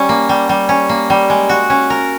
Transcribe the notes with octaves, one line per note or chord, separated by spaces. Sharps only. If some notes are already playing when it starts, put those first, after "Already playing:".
Already playing: G3 C#4
A#3
G3
G3
C#4
A#3
G3
G#3
F#4
C#4
A#4